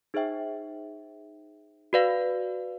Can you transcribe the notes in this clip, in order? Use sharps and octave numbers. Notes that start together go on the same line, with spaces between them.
D#4 G#4 C5 E5 G5
F#4 B4 D5 F5